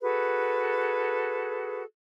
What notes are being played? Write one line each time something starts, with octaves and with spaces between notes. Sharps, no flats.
F#4 G#4 A4 B4